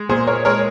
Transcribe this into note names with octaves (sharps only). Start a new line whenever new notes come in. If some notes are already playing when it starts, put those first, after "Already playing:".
Already playing: G#3
A#2 G#4 C5
A#4 C#5
G#3 A#4 C#5